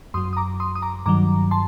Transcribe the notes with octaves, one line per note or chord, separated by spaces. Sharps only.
F#2 F#3 C6 D#6
D#6
A#5 D6
C6 D#6
D#6
A#5 D6
G2 D#3 F#3 A#5 D6
A5 C6